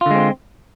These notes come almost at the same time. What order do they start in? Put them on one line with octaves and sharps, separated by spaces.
F4 D3 G#3 C4